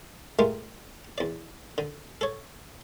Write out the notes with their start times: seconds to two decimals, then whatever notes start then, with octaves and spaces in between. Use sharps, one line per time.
0.39 G#3 A3 F4 G4 A#4
1.18 E2 D5
1.78 D3
2.21 A4 C#5